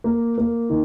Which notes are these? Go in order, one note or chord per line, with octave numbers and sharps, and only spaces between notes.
A#3
A#3
D#3